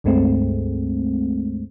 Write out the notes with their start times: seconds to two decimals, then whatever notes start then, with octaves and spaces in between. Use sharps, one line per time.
0.04 C#2 G2 G#3 A3 C4